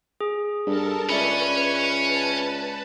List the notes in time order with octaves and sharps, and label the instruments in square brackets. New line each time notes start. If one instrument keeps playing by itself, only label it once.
[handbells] G#4
[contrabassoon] G2 [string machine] A4 A#4 A5
[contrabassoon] C#2 [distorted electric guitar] C#4 [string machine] B4 C#6 [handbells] D5 E5 B5
[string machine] B4 A5